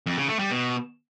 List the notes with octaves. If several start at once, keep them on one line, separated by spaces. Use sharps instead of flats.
F2
C#3
A3
G3
B2